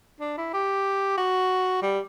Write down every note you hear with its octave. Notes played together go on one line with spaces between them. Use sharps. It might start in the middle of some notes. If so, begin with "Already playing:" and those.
D4
E4
G4
F#4
G3